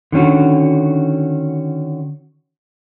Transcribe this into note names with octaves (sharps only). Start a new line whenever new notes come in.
D3 D#3 C#4 F#4